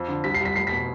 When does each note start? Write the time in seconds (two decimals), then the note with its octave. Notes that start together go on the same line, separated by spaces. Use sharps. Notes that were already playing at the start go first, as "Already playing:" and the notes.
Already playing: F2
0.08 D3
0.24 C2 B6
0.34 C7
0.40 C2
0.45 B6
0.56 F1 C7
0.67 B6
0.72 B2